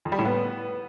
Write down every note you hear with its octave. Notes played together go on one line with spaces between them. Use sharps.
F2
G3
A2
B3